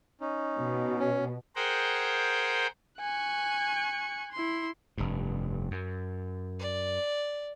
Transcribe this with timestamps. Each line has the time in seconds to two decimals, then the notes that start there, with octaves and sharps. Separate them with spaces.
0.21 C#4 D#4
0.57 B2
1.00 C#4
1.56 G#4 A#4 C5 F#5 G5
3.00 G#5 C#6 F#6
4.32 E4 C6
4.98 F1 G2
5.71 F#2
6.59 D5